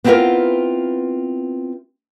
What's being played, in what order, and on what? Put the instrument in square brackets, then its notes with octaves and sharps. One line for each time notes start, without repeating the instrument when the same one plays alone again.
[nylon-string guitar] B3 C4 D4 E4 F4 A#4